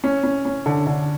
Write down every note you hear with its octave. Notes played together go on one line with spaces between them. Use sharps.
C#4
C#4
C#4
D3
D3